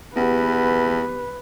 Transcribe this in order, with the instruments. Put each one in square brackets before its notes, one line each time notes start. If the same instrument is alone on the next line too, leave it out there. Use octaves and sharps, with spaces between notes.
[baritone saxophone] E2 [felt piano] B3 G4 [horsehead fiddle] B4